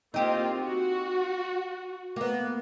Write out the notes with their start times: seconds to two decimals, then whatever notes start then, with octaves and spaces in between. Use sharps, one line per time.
0.14 A#3 C4 D#4 F4 G4
0.61 F#4
2.16 A#3 B3